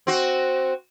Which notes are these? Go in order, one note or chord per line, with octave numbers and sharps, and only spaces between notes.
C4 F#4